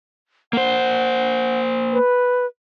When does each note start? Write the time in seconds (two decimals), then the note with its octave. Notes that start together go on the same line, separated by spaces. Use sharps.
0.53 A#3 C5 F#5
1.93 B4